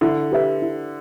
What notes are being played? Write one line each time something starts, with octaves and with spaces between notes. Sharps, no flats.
D3 E4
G4 B4 E5
E4